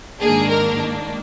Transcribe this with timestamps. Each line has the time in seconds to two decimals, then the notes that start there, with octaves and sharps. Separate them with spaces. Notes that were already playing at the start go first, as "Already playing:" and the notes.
0.20 G#2 D#3 A#3 D4 G#4
0.50 A#4